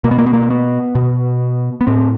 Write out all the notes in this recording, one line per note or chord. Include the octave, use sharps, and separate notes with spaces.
B2 A#3
B3
A#3
B3
A#3
B3
B2
B3
A2 C4